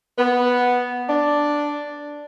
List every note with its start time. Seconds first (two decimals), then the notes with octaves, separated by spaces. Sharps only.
0.18 B3
1.09 D4